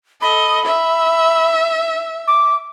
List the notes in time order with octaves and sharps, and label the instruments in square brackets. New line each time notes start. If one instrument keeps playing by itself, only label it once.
[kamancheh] A4 D#5 [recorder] B5
[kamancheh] E5
[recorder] D6